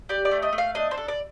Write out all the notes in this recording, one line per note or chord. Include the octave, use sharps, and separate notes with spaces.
G4 D5
D5
A3
D#5
A3
F5
D4 D#5
C5
A4
D5